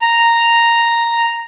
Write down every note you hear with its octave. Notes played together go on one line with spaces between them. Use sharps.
A#5